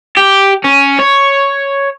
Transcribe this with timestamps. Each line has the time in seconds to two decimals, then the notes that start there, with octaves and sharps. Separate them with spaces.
0.17 G4
0.64 C#4
0.99 C#5